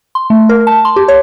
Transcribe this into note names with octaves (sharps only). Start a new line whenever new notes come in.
C6
A3
A#4
A5
C6
G4
C#5